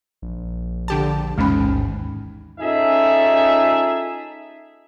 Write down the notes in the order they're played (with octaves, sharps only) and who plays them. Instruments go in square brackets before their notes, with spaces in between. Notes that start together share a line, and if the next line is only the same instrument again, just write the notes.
[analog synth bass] A#1
[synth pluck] D3 G4 A5
[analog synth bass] A1 [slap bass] D#2 G#2 [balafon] G#3 C#4 B5
[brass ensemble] C#4 D#4 F4 G#4 A4 E5